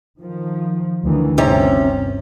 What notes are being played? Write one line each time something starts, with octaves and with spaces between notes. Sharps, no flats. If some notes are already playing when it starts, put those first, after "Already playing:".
D#3 F3
D2 D#3 E3
G1 C3 C#4 A#5